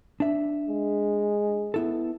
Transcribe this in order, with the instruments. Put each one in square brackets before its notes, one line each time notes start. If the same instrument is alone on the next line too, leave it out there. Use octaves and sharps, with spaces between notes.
[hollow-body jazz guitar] D4 E5
[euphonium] G#3
[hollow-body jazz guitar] B3 E4 A4